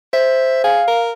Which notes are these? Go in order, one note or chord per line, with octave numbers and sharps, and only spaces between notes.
C5 E5
G#4 F5
A#4